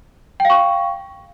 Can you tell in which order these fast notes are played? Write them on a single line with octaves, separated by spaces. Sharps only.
G5 F5 C#6